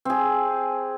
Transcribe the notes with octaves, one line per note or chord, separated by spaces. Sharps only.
C4 G#4